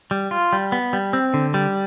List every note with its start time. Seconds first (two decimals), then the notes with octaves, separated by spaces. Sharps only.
0.11 G3
0.31 F4
0.53 G3
0.72 B3
0.93 G3
1.13 C4
1.34 D3
1.54 G3